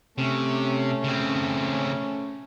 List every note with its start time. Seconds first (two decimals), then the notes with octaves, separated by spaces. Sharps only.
0.18 C3 A3 C#4
1.04 C#3 C4